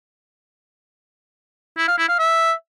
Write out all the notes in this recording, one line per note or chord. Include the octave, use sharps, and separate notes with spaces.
E4
F5
E4
F5
E5